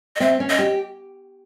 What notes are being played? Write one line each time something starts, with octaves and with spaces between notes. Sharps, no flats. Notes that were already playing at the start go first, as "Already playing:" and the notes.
D#5
C4 E5
C#4
D#5
G4